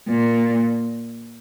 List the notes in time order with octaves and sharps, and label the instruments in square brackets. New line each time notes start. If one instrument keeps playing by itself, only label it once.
[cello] A#2